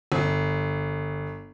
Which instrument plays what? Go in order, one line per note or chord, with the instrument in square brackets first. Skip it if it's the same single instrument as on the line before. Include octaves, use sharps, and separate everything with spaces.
[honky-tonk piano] G1